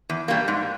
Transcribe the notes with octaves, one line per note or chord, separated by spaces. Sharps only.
E2
B2 G3 A#3
G#2